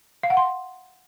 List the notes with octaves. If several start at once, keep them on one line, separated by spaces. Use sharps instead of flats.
F5
F#5
C6